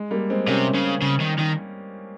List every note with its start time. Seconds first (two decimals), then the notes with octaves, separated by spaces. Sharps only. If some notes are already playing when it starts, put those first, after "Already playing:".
Already playing: G#3
0.11 G3 A#3
0.30 G#3 C4
0.48 C3 A#3 C#4
0.75 C#3
1.02 C#3
1.20 D#3
1.38 D#3